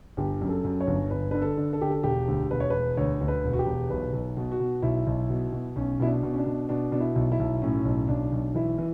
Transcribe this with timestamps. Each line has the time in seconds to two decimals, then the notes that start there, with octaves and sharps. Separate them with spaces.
0.17 G1 G4
0.41 F#2
0.49 A4
0.64 F#2
0.81 C#5
0.87 G1
1.10 G1 B4
1.31 D3 B4
1.42 A4
1.57 D3
1.73 A4
1.81 D3 G4
1.91 A4
2.03 E1 G4
2.28 D2
2.51 E1 B4
2.60 C#5
2.70 E1 B4
2.97 D2 C#5
3.21 D2
3.28 B4
3.44 E1
3.53 F#4
3.59 G4
3.66 E1
3.90 B1 B4
4.13 B1
4.37 B2
4.52 F#4
4.60 B2
4.82 B1 E4
5.07 B1
5.30 B2
5.53 B2
5.76 B1 C#4
6.00 B2 E4
6.06 D4
6.23 B2
6.33 C#4
6.38 D4
6.46 B2
6.69 B2 D4
6.92 B2 D4
7.00 E4
7.16 B1
7.32 E4
7.39 B1
7.62 A2 C#4
7.85 B1
8.08 B1 D4
8.32 B1
8.55 E3 E4
8.78 E3